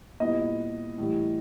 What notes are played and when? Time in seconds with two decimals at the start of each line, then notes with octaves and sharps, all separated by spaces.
0.20 A#2 G3 B3 E4 D#5
0.98 A2 E3 G3